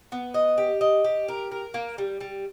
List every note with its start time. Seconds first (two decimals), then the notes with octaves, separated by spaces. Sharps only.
0.12 B3
0.34 D#5
0.58 G4
0.81 D#5
1.04 G4
1.28 A#4
1.51 A#4
1.74 A#3
1.98 G3
2.20 G3